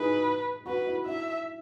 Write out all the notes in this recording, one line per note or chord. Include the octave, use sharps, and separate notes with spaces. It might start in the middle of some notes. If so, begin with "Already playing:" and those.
Already playing: D#4 E4 F#4 G#4 B4
F#4 B4
E4
E4 E5